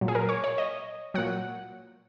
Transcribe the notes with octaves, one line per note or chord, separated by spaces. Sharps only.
A#2 F#3
G#4
A#4
C#5
C#5
D#5
A#2 F#3 F#5